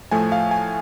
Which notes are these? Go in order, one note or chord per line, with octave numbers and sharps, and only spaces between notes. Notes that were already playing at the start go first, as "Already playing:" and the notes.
A2 F3 A3 G#5
F5
G#5